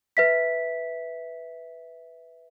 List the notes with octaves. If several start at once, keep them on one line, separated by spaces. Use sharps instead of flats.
B4 E5 B6